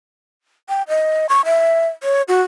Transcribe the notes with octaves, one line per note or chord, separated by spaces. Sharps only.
G5
D#5
C#6
E5
C#5
F#4